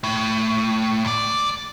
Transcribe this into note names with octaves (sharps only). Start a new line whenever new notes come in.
A2
D2 D5